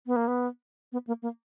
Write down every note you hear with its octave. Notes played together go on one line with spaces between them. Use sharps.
B3
A#3
B3
B3
A#3
A#3